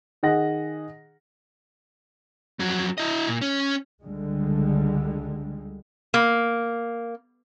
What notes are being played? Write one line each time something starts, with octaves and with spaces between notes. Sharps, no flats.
D#3 G#4 D#5 F#5 A#6
F2 F#3
E4 D#5
A#2
C#4
C#2 D3 G3 G#3
A#3